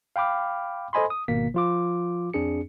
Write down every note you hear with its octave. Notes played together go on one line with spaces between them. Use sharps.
F5 G5 B5 D6 F6
A4 C5 D#5 G#5 B5 C6
D#6
G#1 B2 A#3 B6
F3 F4 D6
F2 C4 D4 G#4 C#7